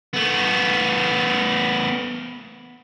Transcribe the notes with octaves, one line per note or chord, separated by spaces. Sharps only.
A3 B3